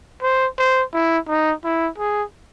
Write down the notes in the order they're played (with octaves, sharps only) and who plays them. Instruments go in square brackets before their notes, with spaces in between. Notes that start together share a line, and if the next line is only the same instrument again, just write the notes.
[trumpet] C5
C5
E4
D#4
E4
G#4